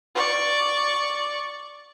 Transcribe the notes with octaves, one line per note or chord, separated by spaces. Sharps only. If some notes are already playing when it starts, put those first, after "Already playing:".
D5 C#6